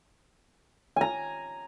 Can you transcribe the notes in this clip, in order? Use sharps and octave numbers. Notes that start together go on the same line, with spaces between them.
G#5 A#5